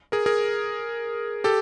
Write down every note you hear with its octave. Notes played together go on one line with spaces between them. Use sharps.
G#4 A#4
G#4 A#4
G4 A4